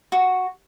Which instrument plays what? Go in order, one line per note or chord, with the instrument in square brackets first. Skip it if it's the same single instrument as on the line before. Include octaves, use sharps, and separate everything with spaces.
[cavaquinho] F#4